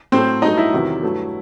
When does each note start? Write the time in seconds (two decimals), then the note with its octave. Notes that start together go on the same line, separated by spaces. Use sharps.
0.12 A2 F#3 A3 C4 C5
0.42 G2 F#3 A3 D#4 D#5
0.58 E4 E5
0.73 E2 C3 D#3 F#3
1.03 G2 F#3 A3